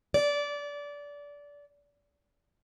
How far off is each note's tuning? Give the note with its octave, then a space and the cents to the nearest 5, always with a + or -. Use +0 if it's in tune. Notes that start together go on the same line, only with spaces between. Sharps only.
D5 -20